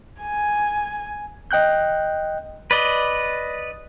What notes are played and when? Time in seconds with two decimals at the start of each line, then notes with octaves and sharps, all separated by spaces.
0.21 G#5
1.51 D#5 G5 F#6 G6
2.71 B4 D5 D#5